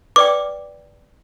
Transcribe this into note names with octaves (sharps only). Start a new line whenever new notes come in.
B4 D5 G5 D6